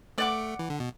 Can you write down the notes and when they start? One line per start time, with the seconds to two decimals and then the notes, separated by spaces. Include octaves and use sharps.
0.18 A3 D5 F#5 D6
0.59 E3
0.70 D3
0.80 B2